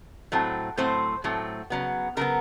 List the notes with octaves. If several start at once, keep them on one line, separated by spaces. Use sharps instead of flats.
A2 F#3 A3 C4
A2 F#3 A3 C4 C5
A2 F#3 A3 C4
C#3 F#3 B3
C#3 F#3 B3 A#4